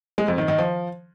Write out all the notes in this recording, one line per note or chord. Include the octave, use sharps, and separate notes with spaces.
G#3
F2
D#3
D#3
F3